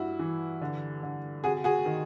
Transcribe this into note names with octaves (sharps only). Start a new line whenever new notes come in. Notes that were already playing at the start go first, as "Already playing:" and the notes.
Already playing: G2 E4 F#4
E3
D3
D3
C3 F#4 G#4
F#4 G#4
D#3